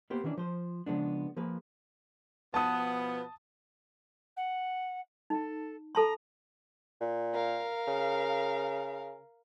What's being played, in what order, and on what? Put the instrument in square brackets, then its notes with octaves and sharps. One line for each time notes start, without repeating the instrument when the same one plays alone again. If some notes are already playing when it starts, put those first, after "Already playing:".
[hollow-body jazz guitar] A#3 B3 G4 C5
D#3 E3 C#4 D4
F3 C5
C#3 F3 G#3 B3 D4
F3 A#3 G#4 B4
[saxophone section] B2 F3 B3 [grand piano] A5 D#6
[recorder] F#5
[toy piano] D#4 [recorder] A4
[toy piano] A4 A5 C6 [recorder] A#5
[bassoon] A#2
[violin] A#4 F5
[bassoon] C#3